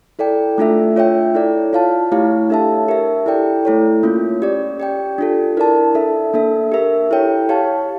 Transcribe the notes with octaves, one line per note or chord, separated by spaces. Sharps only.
E4 A4 D5 G5
A3 D4 F4 A4 E5
F4 C#5 E5 G5
E4 A4 D5
F4 C#5 F5 A5
A3 E4 G4 C#5 F5
D4 A4 E5 A5
G4 A#4 E5
E4 A4 D5 G5
A3 E4 A4 C#5
A#3 C#4 F4
C#4 G4 D5
G4 D5 G5
D4 F4 A4
E4 A#4 D5 A5
D4 A4 E5
A#3 D4 A4 E5
G4 A#4 E5
E4 A4 C#5 G5
G4 C#5 F5 A5